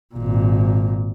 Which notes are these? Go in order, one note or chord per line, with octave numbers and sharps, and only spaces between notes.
G#1 A#2